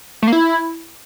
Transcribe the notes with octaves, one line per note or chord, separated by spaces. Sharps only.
A3
A#3
E4